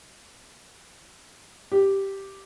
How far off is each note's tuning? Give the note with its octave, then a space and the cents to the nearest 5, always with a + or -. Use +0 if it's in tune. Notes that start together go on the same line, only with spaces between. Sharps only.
G4 -5